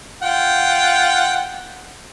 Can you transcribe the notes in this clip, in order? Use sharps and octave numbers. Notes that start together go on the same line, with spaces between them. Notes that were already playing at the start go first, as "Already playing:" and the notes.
F4 F#5 G5